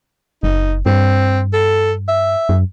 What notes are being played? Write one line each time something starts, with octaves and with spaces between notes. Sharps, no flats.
F#1 D#4
G2 C4
A4
E5
F#2